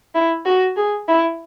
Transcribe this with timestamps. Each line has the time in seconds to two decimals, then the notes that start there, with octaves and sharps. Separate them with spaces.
0.15 E4
0.46 F#4
0.76 G#4
1.08 E4